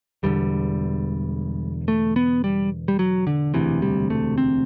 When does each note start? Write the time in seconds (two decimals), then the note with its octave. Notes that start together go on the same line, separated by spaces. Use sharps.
0.23 E1 E2 D3 G3
1.88 A3
2.16 B3
2.44 G3
2.88 G3
2.99 F#3
3.27 D3
3.54 E1 D2 C3 E3
3.82 G3
4.10 A3
4.38 C4